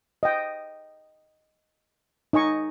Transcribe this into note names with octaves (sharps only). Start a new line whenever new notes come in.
D#5 G5
D#4 D#5 G#5 C#6